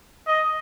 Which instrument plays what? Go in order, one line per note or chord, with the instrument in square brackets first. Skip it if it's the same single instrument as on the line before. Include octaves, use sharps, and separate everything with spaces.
[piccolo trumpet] D#5